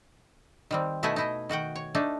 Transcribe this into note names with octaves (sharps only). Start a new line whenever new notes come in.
D#3 G3 C4
B2 A3 D#4 E4 F#5 G#5
D#4 E4 D#5
D#3 F#4 F#5 G5
C#5
A3 D4 D#4